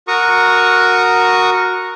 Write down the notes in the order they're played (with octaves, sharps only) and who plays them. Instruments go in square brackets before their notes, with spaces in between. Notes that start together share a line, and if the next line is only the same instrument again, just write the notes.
[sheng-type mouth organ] F#4 A#4 A#5 C#6 D#6